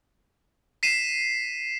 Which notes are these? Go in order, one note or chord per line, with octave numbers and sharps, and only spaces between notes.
B6 C7 D#7 E7